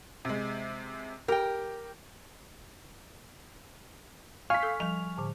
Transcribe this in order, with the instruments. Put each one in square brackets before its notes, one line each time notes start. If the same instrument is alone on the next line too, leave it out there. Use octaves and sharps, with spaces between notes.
[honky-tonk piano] C3 G#3
[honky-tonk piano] G4 [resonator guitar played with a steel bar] A#4 G5
[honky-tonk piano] F5 B6 [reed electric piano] G#5 C#6 F6
[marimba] A4 E6
[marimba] F3 G3 [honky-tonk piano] F7
[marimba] A2 D3